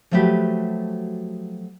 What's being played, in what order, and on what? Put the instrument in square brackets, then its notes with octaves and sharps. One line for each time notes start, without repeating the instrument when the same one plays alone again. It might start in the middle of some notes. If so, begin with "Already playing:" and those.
[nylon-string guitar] F3 F#3 A3 F#4 G4 B4